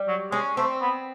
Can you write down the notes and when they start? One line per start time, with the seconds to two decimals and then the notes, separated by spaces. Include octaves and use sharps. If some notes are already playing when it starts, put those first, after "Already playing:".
Already playing: G3
0.08 F#3
0.32 G#3 C#4
0.57 A3 C4
0.81 B3